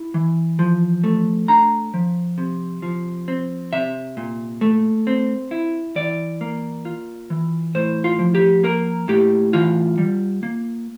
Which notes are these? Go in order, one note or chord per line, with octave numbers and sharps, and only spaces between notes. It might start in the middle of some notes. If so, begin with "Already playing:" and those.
Already playing: E4
E3
F3
A3
D4 A#5
F3
C3
F3
C4
C3 E5
A#2
A3
C4
E4
E3 D5
A#3
F4
E3
A2 C5
F4
F3
G4
A#3 A#4
A2 G4
E3 F4
G3
A#3